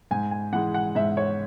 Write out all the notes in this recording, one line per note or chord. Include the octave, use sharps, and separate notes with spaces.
G#2 G#5
G#5
E3 G#3 F#5
F#5
G#2 E5
C#5